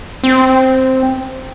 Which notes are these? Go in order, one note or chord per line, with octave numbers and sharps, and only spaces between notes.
C4